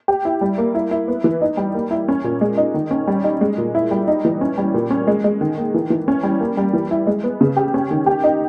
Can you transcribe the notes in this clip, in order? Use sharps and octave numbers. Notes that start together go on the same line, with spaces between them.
G4
E4
G3
A#3
E4
E4
B3
E3
D#4
G3
A#3
E4
C#4
A#2
G#3
D#4
D#3
C#4
G3
D#4
G#3
A#2
E4
G3
D#4
E3
C#4
G3
A#2
C#4
G#3
G#3
D#3
A#3
E3
E3
C#4
G3
A#3
G3
E3
E4
G#3
B3
C#3
G4
C#4
D#3
G4
D#4